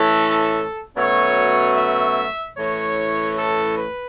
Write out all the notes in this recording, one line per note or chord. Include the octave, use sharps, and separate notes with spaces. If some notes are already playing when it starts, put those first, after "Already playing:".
Already playing: A2 E3 C#4 A4
B2 F#3 A3 C#4 C#5
E5
A2 E3 C#4 C#5
A4
B4